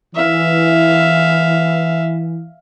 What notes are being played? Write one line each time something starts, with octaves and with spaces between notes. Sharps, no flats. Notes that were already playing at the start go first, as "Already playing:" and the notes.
E3 E5 F5